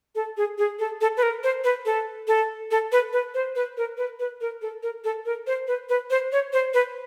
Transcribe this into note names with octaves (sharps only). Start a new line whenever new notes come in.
A4
G#4
G#4
A4
A4
B4
A#4
C5
B4
A4
A4
A4
B4
B4
C5
B4
A#4
B4
B4
A#4
A4
A#4
A4
A#4
C5
B4
B4
C5
C#5
C5
B4